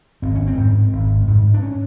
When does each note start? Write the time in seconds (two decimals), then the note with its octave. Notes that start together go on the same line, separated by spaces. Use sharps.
0.22 G#1 C4
0.35 C#4
0.47 C4
0.57 G#2
0.93 G#1
1.27 G#2
1.54 D4
1.62 C#4